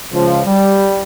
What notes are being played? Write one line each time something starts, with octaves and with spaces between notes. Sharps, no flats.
C#2 F3
G3